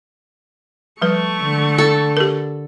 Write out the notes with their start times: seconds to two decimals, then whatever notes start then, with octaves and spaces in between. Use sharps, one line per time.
1.02 F3 G3 A3 B4 C#6
1.42 D3
1.78 A4
2.17 G4 A#4